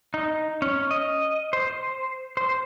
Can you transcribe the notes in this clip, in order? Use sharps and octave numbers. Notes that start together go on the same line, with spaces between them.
D#4
C#4
D#5
C5
C5